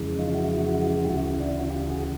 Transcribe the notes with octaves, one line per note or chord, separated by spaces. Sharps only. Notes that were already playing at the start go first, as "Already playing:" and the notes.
Already playing: F2 C#3 E3 G#3
D#4 F4
E4 F#4
G4
D2 C#3 E3 E4 F#4
D4 E4
F#4
F4 G4
F#4 G#4